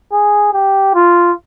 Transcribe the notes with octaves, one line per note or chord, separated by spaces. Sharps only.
G#4
G4
F4